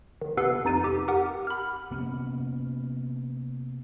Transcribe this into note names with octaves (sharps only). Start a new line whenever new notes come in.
D#3
C3 B3 A4 B4 C7
F2 D#4 A6 D#7
G4
G4 A#4 F#5
B5 F6
C3 A#3 B3 C#4